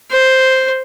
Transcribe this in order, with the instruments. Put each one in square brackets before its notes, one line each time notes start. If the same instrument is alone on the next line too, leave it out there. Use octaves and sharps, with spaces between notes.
[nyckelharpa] C5